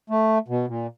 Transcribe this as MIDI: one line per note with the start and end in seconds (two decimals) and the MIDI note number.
0.10 0.38 57
0.48 0.66 47
0.68 0.87 46